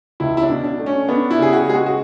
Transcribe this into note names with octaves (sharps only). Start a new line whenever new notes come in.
C#2 E4
E4
D4
B2
D4
A3
C#4
B3 D4
E4
C#3 G#4
F#4
G#3 G#4
F#4
F#4